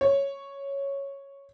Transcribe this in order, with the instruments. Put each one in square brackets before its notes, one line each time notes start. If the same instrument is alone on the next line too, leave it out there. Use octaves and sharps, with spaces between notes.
[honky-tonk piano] C#5